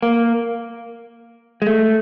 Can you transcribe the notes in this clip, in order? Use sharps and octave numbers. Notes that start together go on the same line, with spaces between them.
A#3
G#3
A3